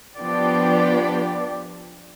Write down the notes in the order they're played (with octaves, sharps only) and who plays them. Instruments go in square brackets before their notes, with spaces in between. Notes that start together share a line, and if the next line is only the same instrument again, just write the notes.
[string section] F3 D4 G4 [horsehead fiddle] B3 D5